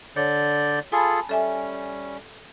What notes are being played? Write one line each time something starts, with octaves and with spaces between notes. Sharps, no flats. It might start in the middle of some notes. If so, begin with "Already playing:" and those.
D3 C#5 D5 G6
F4 G#4 A4 G#5 A5 B5
G3 C#4 A4 E5 G#5